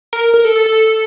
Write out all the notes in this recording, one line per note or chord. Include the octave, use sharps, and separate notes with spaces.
A#4
A#4
A4
A4
A4